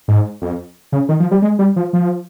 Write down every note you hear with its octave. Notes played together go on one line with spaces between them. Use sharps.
G#2
F2
C#3
D#3
F3
G3
G#3
G3
F3
F3